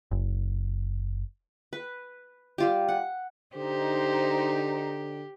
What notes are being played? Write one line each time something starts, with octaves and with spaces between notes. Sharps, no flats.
F#1
B4
G3 F4 G4
F#5
D3 D#4 G4 C5